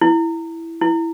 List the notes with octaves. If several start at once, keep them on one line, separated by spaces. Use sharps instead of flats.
E4
E4